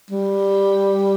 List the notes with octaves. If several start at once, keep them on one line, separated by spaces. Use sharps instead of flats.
G3